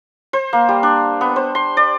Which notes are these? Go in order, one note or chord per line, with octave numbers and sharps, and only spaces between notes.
C5
A#3
G3
D4
B3
C5
C6
D5